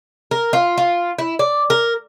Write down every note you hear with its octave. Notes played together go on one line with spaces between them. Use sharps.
A#4
F4
F4
E4
D5
A#4